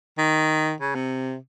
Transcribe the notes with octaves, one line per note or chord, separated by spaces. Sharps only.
D#3
C#3
C3